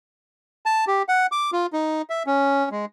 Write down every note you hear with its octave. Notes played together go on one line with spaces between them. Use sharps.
A5
G4
F#5
D6
F4
D#4
E5
C#4
G#3